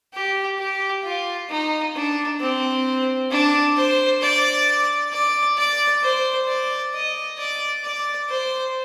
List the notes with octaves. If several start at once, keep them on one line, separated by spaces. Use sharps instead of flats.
G4
G4
F4
D#4
D4
C4
D4
C5
D5
D5
D5
C5
D5
D#5
D5
D5
C5